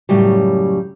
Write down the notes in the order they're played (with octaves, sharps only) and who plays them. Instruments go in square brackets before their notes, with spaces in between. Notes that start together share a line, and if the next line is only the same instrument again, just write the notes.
[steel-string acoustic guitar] F#2 A2 C#3 F#3 G3